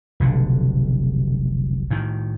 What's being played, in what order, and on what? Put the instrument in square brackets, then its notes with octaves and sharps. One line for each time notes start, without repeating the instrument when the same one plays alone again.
[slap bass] F1 B1 D3
A2 D#3